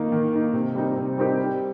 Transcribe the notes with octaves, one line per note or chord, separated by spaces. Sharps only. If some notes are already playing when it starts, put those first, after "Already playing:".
Already playing: D#3 A#3 D#4
D#3
A#3 D#4
C3
G3 C4 D#4 G4
C3
G3 C4 D#4 G4
G3